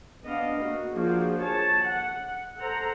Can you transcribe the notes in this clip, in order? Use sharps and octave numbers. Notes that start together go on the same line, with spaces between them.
B3 D4 D#5 F5
A#3 F#4
F3 A#3 D4 F#4 G#4 C5
G#4 C#5 A5
F#5
A4 C5 F#5 A#5